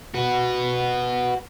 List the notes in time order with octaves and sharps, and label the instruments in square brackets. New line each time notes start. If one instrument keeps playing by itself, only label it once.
[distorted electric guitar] F#4 B4